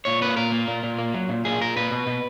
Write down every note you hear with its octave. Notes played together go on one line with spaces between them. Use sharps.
A#2 C#5
A#3 B4
A#2 A#4
A#3
A#2
A#2
A#3
F#3
A#2
A#2 G#4
A#2 A#4
A#2 B4
B2
B2